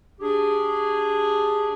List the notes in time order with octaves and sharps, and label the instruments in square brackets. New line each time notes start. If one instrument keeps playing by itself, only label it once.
[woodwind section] D4 G4 G#4